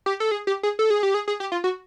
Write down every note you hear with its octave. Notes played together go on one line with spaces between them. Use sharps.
G4
A4
G#4
G4
G#4
A4
G#4
G4
G#4
G#4
G4
F4
F#4